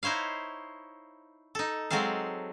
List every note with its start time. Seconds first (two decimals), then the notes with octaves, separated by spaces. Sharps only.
0.03 D#4 E4 C5 C#5 F5
1.55 D#4 A4
1.90 F#3 G#3 C4 A4 F5